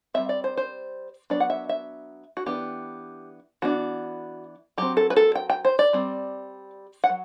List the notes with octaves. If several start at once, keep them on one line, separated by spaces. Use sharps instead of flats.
G3 C4 E5
D5
C5
C5
F#3 B3 D4 D5
F#5
E5
E5
F#4
E3 B3 D4 G4
E3 B3 D4 F#4
F#3 C4 G4
A4
B4
A4
G5
G5
C5
D5
G3 C4
F#5
F#3